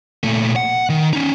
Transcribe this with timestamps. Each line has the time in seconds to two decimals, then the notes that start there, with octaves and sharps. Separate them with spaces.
0.23 A#2 A3
0.56 F#5
0.89 D#3
1.13 C#4 D#4